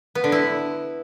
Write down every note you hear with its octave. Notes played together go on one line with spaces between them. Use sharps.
B3
D3
E4